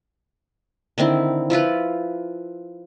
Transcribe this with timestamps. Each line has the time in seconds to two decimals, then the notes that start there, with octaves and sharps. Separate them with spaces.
0.98 D3 D#3 C4 E4
1.50 F3 E4 F4 B4